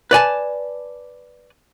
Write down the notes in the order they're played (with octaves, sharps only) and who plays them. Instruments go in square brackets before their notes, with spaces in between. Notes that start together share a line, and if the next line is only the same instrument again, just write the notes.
[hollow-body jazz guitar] B4 D5 G#5 A5